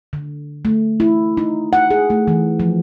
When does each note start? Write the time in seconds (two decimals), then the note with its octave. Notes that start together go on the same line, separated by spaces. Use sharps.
0.13 D3
0.65 A3
1.00 E4
1.37 D#4
1.73 F#5
1.91 G#4
2.10 A3
2.28 E3
2.60 F3